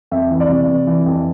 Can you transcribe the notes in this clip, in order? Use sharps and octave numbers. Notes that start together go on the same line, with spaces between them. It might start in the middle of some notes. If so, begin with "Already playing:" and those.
F2 E5
E3
D5
C3
C3
E3
F2